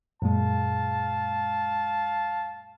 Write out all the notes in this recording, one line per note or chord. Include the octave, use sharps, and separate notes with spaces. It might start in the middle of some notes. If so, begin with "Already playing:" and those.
F#2 A#2 G#3 F5 A5